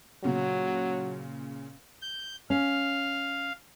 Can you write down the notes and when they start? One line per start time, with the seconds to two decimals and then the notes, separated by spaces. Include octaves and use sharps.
0.24 A#2 C#3 F#3
2.02 G6
2.50 C#4 F5